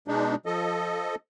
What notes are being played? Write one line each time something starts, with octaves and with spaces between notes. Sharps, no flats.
B2 G#3 D4 D#4
F3 A4 D#5